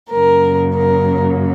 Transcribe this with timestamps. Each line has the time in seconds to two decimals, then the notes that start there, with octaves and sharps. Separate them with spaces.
0.11 F#2 C#3 F#3 A#3 A#4
0.75 A#4